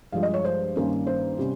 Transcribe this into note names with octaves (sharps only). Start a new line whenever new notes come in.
G2 F3 G#3 F5
D#5
C#5
C5
G2 D#3 A#3 C#4
C5
C3 G3 C#4